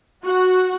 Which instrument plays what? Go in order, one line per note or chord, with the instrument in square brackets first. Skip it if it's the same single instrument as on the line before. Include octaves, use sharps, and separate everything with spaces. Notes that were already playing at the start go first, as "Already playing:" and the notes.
[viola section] F#4